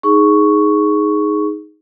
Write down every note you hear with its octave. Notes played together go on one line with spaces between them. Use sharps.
D#4 G#4 C#6